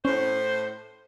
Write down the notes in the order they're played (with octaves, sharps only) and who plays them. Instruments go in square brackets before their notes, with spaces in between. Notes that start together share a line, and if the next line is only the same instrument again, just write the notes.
[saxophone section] A2 C5 [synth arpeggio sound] C#4